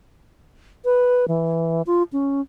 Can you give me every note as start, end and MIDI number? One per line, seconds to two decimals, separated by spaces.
0.85 1.25 71
1.28 1.82 52
1.87 2.03 65
2.13 2.41 61